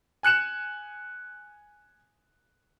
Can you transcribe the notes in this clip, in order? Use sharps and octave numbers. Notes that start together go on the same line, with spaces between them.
G#5 F#6 C#7 E7